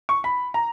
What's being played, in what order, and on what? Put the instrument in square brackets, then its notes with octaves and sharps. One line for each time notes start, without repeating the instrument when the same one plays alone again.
[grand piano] C#6
B5
A#5